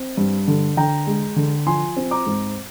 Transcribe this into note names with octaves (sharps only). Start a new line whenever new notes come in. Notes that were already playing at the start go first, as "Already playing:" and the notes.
Already playing: C4
G2
D3
D3 G5 A#5
G#3
D3
F3 G#5 C6
C4
A#5 D6
G#2